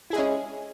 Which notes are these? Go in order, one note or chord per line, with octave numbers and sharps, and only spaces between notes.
G#3 C#4 E4 G#4